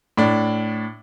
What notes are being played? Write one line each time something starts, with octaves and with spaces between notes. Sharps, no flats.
A2 D4